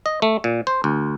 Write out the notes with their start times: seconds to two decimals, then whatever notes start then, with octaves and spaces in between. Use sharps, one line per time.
0.06 D#5
0.22 A3
0.44 A#2
0.67 C5
0.84 D2